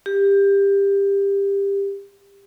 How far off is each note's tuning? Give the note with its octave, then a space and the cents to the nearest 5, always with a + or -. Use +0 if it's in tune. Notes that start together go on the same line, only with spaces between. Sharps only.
G4 +20